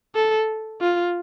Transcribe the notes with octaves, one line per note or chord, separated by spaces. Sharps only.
A4
F4